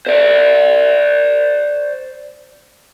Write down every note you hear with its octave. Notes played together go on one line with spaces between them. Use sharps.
C5 D5